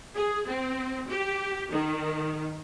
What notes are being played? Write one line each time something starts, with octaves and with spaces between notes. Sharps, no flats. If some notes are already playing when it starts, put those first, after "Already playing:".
G#4
C4
G4
D#3